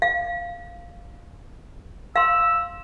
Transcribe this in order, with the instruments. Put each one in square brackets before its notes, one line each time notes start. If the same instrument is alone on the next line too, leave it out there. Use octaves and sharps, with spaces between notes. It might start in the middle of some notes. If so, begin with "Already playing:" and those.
[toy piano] F5
[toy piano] F5 C6 [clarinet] E6